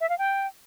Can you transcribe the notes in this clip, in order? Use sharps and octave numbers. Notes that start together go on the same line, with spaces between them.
E5
F5
G5